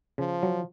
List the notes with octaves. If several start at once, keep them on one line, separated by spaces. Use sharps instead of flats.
C#3 F3
F#3